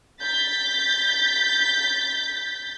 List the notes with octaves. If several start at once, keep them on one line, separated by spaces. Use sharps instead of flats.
G6 A6 B6